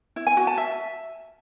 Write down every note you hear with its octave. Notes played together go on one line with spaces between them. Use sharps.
E4
G#5
F#4
A5
E5